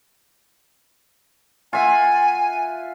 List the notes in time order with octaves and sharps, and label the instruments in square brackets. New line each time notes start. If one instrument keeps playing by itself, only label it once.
[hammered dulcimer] F4 E5 F#5 [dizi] G#5